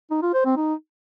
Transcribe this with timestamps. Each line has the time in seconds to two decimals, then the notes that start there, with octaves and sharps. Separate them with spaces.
0.11 D#4
0.22 F4
0.34 C5
0.45 C4
0.56 D#4